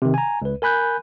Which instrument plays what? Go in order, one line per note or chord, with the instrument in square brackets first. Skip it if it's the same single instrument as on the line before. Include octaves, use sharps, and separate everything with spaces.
[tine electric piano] C3 D#3
G#5 A#5
C#2 B4
A#4 G#5 B5 F#6 G6